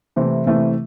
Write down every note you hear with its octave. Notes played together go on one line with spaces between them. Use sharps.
C3 E3 A3 C4 E4
C3 E3 A3 C4 E4